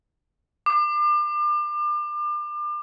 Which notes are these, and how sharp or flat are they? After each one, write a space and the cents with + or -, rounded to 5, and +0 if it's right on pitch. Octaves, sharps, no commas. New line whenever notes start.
D6 +35